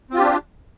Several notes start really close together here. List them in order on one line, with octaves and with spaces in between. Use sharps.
C4 F4 G4 D4